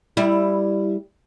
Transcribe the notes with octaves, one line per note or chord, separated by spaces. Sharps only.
G3 E4